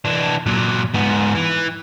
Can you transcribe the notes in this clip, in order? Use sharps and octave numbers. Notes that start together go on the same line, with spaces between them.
E3 D4
A#2 F#3
G#2 B3
E3